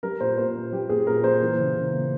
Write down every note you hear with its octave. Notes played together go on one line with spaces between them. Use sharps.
G3 A#4
A#2 C5
A#2 C5
A#3
G3 G4
A#2 G#4
A#2 A#4
A#3 C5
E3
C#3
C#3
A#3